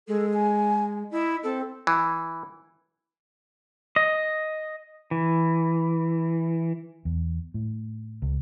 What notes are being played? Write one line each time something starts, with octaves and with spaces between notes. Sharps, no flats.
G#3 A4
G#5
E4 D#5
C4 A4
E3
D#5
E3
E2
A2
C#2